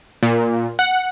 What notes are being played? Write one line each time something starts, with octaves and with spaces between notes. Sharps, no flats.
A#2
F#5